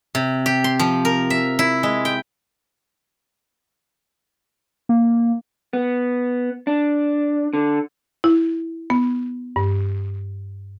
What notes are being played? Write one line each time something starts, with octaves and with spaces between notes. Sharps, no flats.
C3
G4
C6
F3
A#4
E5
E4
G#3
G5
A#3
B3
D4
D3
E4
B3
G2